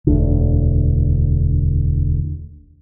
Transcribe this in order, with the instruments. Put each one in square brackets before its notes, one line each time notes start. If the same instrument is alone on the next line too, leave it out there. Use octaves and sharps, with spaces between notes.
[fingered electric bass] E1 D2 D3